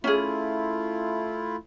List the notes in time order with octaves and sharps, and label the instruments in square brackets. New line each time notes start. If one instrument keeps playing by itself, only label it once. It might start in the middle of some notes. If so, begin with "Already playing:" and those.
[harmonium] A3 E4 F4 [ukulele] C#4 G#4